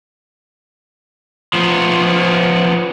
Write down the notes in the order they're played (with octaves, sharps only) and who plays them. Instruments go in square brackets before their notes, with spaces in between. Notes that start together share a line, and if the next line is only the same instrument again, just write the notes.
[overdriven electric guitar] F3 B3